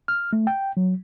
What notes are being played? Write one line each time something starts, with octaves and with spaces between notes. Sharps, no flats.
F6
A3
G5
F#3